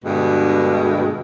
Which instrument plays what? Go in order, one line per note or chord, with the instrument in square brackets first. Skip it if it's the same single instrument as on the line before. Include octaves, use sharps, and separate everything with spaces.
[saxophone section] G2 B2 D3 G#3